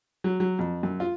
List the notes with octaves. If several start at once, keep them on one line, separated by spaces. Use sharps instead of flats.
F#3
F#3
F2
F#2
F4